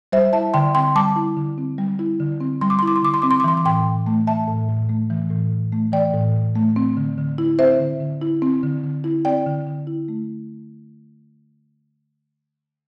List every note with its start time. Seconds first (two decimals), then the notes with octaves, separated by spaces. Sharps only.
0.12 G3 C5 E5
0.33 E4 E5 A5
0.54 D3 G5 C6
0.74 C4 G5 C6
0.95 G3 A5 D6
1.16 E4
1.37 D3
1.58 C4
1.78 G3
1.99 E4
2.20 D3
2.40 C4
2.61 G3 C6
2.70 D6
2.79 C6
2.83 E4
2.88 D6
2.96 C6
3.03 D3 D6
3.14 C6
3.22 C4 D6
3.31 C6
3.40 D6
3.44 E3 C6
3.57 D6
3.65 A2 G5 C6
3.86 A2
4.06 A3
4.27 E3 E5 A5
4.48 A2
4.69 A2
4.89 A3
5.10 E3
5.31 A2
5.51 A2
5.72 A3
5.93 E3 D5 G5
6.14 A2
6.35 A2
6.55 A3
6.76 C4
6.97 D3
7.18 D3
7.38 E4
7.59 C4 C5 E5
7.80 D3
8.00 D3
8.21 E4
8.42 C4
8.63 D3
8.84 D3
9.04 E4
9.25 C4 D5 G5
9.46 D3
9.67 D3
9.87 E4
10.08 A3